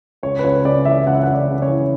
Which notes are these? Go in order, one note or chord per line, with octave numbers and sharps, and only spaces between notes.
C#2 C#5
B4
C#2 C#5
C#3 D5
E3 E5
C#2 F#5
E5
F#5
C#2
D5
C#3
C#5
E3